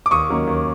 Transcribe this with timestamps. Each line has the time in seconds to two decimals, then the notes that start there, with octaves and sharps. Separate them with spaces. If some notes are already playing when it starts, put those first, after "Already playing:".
0.06 D6
0.11 D#2 C#6 D#6
0.29 D#3 F#3 A#3 C#4
0.47 D#2